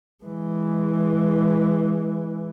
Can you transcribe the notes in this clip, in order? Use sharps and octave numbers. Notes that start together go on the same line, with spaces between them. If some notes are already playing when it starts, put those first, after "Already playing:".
E3 G#3